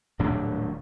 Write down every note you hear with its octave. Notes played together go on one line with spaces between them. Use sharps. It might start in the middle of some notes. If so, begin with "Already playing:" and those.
D#1 A2 F#3 D4